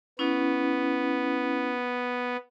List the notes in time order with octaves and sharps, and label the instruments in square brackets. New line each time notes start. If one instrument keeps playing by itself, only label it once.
[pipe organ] B3 [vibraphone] C#4 E4